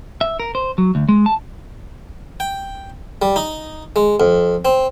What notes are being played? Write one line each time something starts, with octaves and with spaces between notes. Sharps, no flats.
E5
A#4
C5
F#3
D2
G#3
A5
G5
G3
D#4
G#3
F2
C4